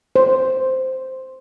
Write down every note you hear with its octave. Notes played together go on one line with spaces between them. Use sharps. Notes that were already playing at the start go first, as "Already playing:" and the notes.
C5